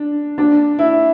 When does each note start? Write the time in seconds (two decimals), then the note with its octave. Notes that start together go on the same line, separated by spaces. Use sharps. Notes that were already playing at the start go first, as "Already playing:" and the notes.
Already playing: D4
0.38 D4
0.79 E4